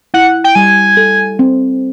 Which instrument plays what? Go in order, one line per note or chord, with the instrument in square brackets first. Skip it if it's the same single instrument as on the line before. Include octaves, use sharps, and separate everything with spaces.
[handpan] E4 [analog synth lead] F#5
[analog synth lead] G5
[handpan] G3 [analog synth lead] G#5
[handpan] A4
C4